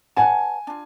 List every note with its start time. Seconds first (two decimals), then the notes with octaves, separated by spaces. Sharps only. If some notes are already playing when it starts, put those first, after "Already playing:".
0.16 B4 D5 F#5 G#5 A5
0.67 D4 F4